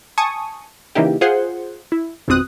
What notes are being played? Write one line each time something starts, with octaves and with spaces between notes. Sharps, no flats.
G#5 A5 C#6 D#6
C#3 E3 A#3 D#4 E4 G4
F4 G#4 C5 F#5 C6
E4
G#1 F2 B2 C4 D#6 F#6